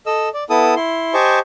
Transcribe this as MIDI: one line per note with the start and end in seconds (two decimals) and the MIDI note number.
0.06 0.29 69
0.06 0.29 75
0.06 0.29 88
0.34 0.44 74
0.50 0.75 59
0.50 0.75 64
0.50 0.75 69
0.50 0.75 81
0.50 0.75 87
0.76 1.14 64
0.76 1.14 84
1.14 1.39 67
1.14 1.39 72
1.14 1.39 75
1.14 1.39 80
1.14 1.39 81
1.14 1.39 85